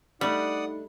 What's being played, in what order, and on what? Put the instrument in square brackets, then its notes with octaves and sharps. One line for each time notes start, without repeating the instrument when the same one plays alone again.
[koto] G3 [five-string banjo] A3 D4 [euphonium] D#4 [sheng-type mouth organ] D5 F#5 D#6